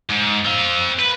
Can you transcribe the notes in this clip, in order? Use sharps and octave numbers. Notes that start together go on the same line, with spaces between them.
G#2
C4 F5
B4